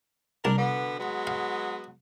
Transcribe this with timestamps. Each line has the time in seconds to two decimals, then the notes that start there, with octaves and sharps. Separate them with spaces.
0.45 C2 A#3 D4 A#4 A5
0.58 B2 D3 B3
0.98 F#3 G#3 B3
1.27 F5